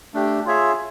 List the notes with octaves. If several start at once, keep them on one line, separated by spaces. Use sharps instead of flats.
A3 D4 G4
F4 G#4 C#5 E5